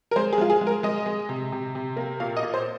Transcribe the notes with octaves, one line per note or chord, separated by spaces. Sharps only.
A#4
G#3 C5
G#4
G#3 F4
G#4
G#3
A#4
G#3 D#5
G#3
C3
C3
C3
A#3
A#2 F5
D#5
A#2
C5